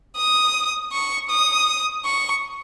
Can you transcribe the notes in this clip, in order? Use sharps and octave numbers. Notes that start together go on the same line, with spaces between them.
D#6
C#6
D#6
C#6